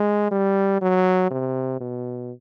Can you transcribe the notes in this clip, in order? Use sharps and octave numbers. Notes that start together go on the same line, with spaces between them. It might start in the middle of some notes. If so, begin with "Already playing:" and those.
Already playing: G#3
G3
F#3
C3
B2